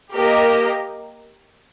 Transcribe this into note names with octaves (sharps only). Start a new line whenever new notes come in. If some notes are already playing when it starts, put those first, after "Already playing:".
A#3 G4 A#4 D#5